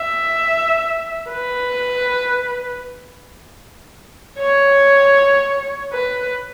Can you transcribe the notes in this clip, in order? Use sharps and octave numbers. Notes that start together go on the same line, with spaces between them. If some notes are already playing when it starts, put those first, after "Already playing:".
Already playing: E5
B4
C#5
B4